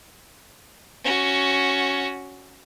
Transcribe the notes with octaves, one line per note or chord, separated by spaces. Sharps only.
C#4 F#4